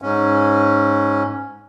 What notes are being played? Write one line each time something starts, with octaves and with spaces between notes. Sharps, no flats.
G#2 C#4